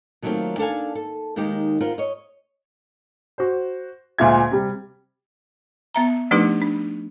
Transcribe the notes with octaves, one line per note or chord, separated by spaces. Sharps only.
D#3 F#3 A3 A#3 C4 F4
D4 A4 F5 G#5
A4
D#2 D#3 G#3 D#4 G4
F4 A#4 C5 F#5
C#5 D#5
F#4 C5
D2 A#2 G#3 F4 E5 G#6
C3 G3
B3 E5 A#5
F3 A3 D4 D#4 G4 B4
D4